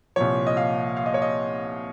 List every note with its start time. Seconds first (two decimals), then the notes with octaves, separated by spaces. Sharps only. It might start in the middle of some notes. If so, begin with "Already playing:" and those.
0.16 C2 A#2 F3 C#5
0.47 D#5
0.57 F5
0.97 F5
1.06 D#5
1.14 C#5
1.22 D#5